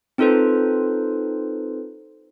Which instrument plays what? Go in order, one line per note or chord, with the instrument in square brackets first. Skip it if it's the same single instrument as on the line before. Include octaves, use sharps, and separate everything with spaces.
[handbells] C4 D#4 F4 A4 B4 C5